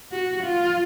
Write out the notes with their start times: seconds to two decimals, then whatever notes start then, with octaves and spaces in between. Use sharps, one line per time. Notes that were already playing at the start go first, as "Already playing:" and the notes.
0.12 F#4
0.43 F4